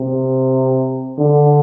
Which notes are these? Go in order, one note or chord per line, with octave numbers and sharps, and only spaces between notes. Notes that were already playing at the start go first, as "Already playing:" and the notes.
Already playing: C3
D3